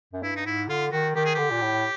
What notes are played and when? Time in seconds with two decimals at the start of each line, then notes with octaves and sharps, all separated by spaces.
0.13 F#2
0.23 G2 E4
0.36 D#4
0.46 G#2 E4
0.69 D3 F4
0.92 D#3 F#4
1.15 D#3 G4
1.25 G#4
1.35 D3 G4
1.51 A#2
1.61 A2